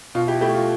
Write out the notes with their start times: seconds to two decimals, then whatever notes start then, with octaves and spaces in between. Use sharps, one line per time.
0.15 B2 F4
0.27 E4 G4
0.41 A3 E4 G4
0.54 F4